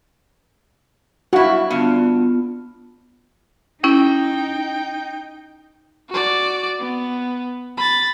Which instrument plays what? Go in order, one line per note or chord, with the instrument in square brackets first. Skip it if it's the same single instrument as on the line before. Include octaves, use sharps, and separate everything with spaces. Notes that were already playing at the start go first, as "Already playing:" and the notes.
[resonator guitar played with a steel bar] G2 E4 [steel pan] F#4
[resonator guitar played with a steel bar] G2 D3 [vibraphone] B3 F4
[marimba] C#4 E4 [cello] D#4 [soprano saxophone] G5
[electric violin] F#4 D5
B3
B5 A6